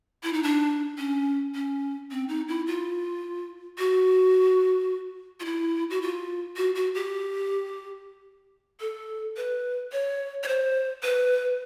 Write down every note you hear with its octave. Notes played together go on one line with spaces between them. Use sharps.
E4
D#4
D4
C#4
C#4
C4
D#4
E4
F4
F#4
F4
E4
F#4
F4
F#4
F#4
G4
A4
B4
C#5
C#5
C5
B4